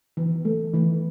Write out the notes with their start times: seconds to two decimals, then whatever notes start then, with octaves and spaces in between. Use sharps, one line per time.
0.17 E3
0.45 A3
0.74 E3